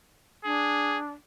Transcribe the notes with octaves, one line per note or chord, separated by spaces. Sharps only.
D4 G#4